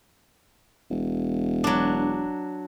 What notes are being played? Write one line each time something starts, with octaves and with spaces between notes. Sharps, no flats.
E1
F#3 D4